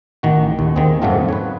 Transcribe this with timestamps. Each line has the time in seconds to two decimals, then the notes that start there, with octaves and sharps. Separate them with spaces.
0.23 A1 D#3 F#4
0.59 D#2
0.76 D#3 A#3 C4 G#4
1.02 F2 G#2 C#3 F#3 A3 F4
1.29 B4 C#5